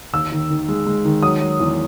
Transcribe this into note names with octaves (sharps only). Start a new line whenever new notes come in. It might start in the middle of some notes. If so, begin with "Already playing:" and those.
D#2 E6
D#3
D#3
G#3
G#3
D#3
F#3 D#6
F#3
E2